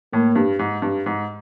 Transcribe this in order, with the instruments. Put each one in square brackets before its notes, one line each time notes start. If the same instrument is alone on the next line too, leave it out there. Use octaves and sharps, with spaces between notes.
[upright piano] A2 [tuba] A#3
[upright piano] G2
G#2
G2
G#2